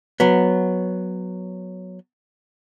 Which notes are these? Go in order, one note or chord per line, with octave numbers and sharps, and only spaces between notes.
F#3 B3